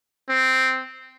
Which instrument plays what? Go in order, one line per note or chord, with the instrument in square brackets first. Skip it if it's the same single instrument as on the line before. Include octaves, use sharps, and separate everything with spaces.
[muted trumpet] C4